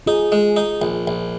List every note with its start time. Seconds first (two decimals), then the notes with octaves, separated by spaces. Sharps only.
0.06 D#4 F4 G#4
0.32 G#3
0.56 D#4
0.82 A#1
1.07 A#1